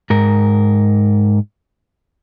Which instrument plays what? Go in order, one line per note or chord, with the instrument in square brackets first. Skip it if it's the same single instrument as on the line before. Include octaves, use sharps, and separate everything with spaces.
[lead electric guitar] G#2 A#4